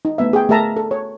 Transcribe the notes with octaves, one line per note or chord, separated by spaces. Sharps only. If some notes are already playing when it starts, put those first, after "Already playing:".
D#4
A3 B3 E5
G#4 G5
A3 G#4 A#4 E5 A5 A#5
A4
C#5